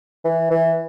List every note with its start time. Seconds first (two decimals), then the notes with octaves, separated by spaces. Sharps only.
0.25 E3
0.51 E3